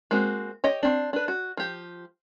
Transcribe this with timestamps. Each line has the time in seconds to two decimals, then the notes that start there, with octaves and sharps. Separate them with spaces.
0.11 G#3 A#3 C4 F#4
0.64 G4 C#5 D#5
0.83 C4 D4
1.13 D4 B4
1.28 F#4
1.57 F3 G4